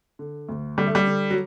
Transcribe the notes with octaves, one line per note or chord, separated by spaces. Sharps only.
D3
D2
D3 G3
A3
G3
D3
F#3